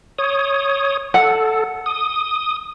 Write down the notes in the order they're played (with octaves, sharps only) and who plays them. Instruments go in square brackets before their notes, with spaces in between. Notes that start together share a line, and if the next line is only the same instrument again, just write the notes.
[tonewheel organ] C#5 D#6
[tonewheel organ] A4 [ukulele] F#5
[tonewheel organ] D#6